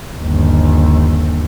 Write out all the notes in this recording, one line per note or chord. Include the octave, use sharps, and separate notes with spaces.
G1 D#2